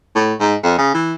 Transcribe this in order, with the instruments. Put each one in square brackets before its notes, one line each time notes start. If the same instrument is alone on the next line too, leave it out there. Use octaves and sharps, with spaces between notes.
[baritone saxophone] A2
G#2
F2
C#3
E3